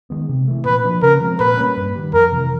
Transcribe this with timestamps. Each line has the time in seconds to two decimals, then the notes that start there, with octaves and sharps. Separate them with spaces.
0.10 D#3 G#3 B3
0.29 C3
0.48 E3 A3
0.65 A#2 B4
0.84 F3 A#3 D4
1.02 C#3 A#4
1.20 F3 G#3 C4
1.40 A#2 B4
1.57 G3 A#3 C#4
1.77 G2
1.95 D#3 G3
2.13 F2 A#4
2.32 C3 E3